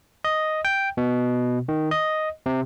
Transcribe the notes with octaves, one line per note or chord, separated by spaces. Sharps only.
D#5
G5
B2
D#3
D#5
C3